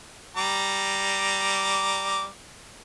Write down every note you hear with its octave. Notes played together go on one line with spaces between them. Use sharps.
G3 A#5 D6